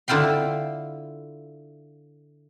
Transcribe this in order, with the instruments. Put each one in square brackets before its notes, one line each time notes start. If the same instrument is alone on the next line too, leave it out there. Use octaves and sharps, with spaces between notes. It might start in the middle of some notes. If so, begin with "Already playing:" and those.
[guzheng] D3 E4 F4 G5 C6